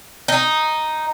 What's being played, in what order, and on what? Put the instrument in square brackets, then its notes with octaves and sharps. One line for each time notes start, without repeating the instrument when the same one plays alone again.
[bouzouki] D#4